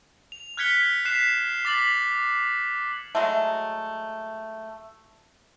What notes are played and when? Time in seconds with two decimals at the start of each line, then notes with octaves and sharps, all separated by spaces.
0.32 F7
0.57 F6 F#6 G#6 B6 C#7 G7
1.05 F#6 B6 C7 E7
1.65 D6 A6 B6 F#7
3.15 F#3 G#3 A3